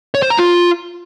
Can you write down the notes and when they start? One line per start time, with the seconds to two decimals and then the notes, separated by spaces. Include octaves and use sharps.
0.14 C#5
0.22 C5
0.30 A#5
0.38 F4